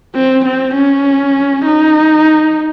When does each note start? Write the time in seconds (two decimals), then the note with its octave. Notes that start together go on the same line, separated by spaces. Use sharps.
0.15 C4
0.45 C4
0.75 C#4
1.65 D#4